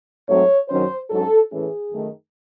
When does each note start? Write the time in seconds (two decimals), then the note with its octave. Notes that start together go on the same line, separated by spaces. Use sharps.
0.28 G#2 F#3 A3 C4 C#5
0.69 F#2 D#3 F#3 C#4 C5
1.10 G#2 F#3 C#4 A4
1.51 A2 E3 A3 C#4 G#4
1.92 F#2 D#3 A3